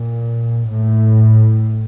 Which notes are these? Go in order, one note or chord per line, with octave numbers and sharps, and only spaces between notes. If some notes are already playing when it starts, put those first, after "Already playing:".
Already playing: A#2
A2